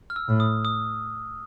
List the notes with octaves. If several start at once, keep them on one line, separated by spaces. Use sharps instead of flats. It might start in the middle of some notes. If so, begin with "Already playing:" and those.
F6
E6
A2
D#6
D#6